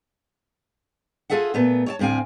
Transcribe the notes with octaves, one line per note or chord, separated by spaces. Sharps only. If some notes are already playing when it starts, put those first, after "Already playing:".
F4 G#4 A4 E5 F#5
A#2 A3 B3
C#5 D5 A5
D2 A2 C4 F5 G#5